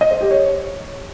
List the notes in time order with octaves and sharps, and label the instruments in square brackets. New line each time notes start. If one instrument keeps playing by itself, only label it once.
[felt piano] D#5
C5
G4
C#5